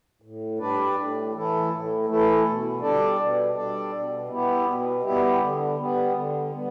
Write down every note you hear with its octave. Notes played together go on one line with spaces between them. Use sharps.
A2
G3 D4 B4 D5
A2
E3 A3 E4 A4
A2
E3 A3 E4 A4
B2
G3 D4 A4 D5
B2
G3 D4 A4 D5
B2
G3 B3 E4 G4
B2
G3 B3 E4 G4
D3
G3 B3
D3
G3 B3